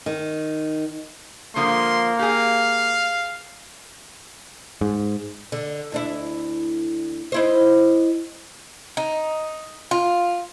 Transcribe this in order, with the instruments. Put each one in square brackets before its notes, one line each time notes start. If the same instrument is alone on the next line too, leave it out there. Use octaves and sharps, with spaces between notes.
[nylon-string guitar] D#3
[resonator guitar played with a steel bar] D3 F3 G#3 [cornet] A#3 [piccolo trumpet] C6
[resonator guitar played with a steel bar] G4 G#4 [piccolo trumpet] F5
[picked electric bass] G#2
[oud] D3
D2 D4 E4
D#4 E4 C5
[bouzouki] D#4
F4